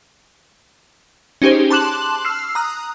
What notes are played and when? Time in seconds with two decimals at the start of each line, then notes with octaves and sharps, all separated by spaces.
1.42 C#4 D#4 G4 G#4 C5
1.70 A5 C6 D6 F#6 E7 F#7
2.25 E6 F6 C7
2.55 A#5 D#6 F#6